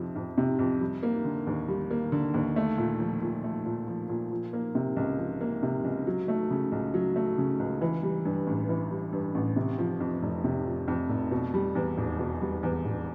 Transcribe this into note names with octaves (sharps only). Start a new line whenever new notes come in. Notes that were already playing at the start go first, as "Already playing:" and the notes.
Already playing: F2 C3 F3
F2
C3
F2
G3
A#3
D3
D#2
G3
A#3
D3
D#2
A3
A#2
F3
A#2
A3
A#2
F3
A#2
F3
A#3
C3
C#2
F3
A#3
C3
C#2
F#3
A3
C#3
C#2
F#3
A3
C#3
C#2
E3
G3
G2
A1
E3
G3
G2
A1
C3
F3
F2
F1
C3
F3
F2
F1
B2
G3
E2
E1
B2
G3
E2
E1